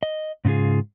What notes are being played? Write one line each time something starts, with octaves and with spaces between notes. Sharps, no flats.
D#5
G#2 C#3 C#4 F4 G#4